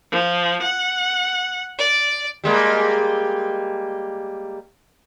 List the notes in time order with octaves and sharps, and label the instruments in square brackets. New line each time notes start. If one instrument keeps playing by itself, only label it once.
[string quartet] F3
F#5
D5
[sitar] G3 G#3 A#3